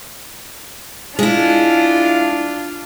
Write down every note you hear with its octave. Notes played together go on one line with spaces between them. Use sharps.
G#3 D4 E4 F4